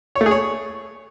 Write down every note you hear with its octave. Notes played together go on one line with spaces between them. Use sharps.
C#5
A3
G#4
C#5